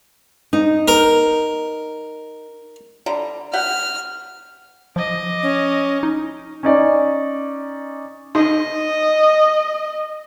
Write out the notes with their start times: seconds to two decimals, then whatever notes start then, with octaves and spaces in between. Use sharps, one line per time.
0.53 D#4
0.88 A#4
3.06 D3 G3 A#5
3.53 G4 F#5 F6
4.96 F3 D#5 D6
5.43 C#4
6.03 D#4
6.63 C#4 D#4 D5
8.35 D#4 D#5